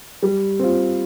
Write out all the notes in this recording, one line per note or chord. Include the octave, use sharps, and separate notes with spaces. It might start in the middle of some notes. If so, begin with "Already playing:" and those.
G3
C4 F4